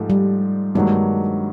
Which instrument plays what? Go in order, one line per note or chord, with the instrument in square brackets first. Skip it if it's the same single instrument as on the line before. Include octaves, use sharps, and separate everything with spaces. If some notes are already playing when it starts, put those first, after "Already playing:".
Already playing: [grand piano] G#2 F3 A3 G4
[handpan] G3
[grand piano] G2 D#3 F#3 A#3 [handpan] G#3